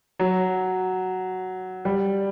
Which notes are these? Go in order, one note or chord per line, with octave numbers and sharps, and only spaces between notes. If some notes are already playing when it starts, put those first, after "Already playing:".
F#3
G3